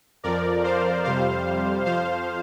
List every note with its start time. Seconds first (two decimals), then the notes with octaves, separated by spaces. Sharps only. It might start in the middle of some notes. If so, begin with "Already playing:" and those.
0.23 F2 F3 A#4 D5
0.64 C5 F5
1.04 F2 C3 G3 C5 F5
1.85 F2 F3 C5 F5